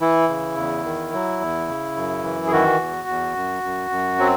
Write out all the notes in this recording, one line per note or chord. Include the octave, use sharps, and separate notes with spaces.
E3 E4
C#3
E2
D#3
F#3
E2
C#3
F#2
E3
G#4
D#3 F#4
E2
E2
F#2
F#2
F#2
F#3 C4